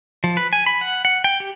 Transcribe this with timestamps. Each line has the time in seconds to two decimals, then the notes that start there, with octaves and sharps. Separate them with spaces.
0.24 F3
0.37 B4
0.53 G#5
0.66 B5
0.81 F#5
1.05 F#5
1.24 G5
1.40 G4